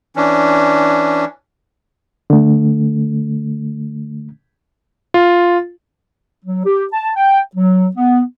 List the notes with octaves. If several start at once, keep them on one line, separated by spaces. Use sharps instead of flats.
E3 C#4 D4
D3 A3
F4
F#3
G4
A5
G5
F#3
B3